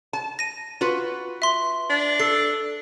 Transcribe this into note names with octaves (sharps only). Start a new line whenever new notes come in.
A5
A#6 D#7
F4 F#4 B4
E5 C6
D4
A4 C7